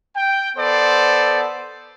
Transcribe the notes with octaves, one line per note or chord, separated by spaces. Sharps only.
G5
B3 A4 C5 D5